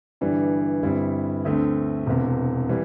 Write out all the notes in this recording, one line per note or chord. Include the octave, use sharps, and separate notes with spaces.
G1 G2 E3 G3 D4
G1 G2 G3 C4 E4
D2 D3 A3 C4
E1 E2 C3
E3 G3